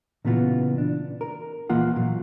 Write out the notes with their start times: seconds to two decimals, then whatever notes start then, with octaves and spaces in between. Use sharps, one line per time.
0.25 A#2 C#3 E3 B3 F4 F#4
0.78 D4
1.21 A#4
1.69 A#2 E3 A#3 F4 F#5
1.96 A#2 F#3